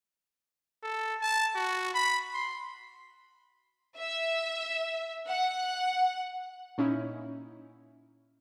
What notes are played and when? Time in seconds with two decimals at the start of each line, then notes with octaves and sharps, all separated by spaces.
0.83 A4
1.21 A5
1.55 F#4
1.94 B5
2.33 C6
3.98 E5
5.28 F#5
6.78 A#2 C#4 D#4 E4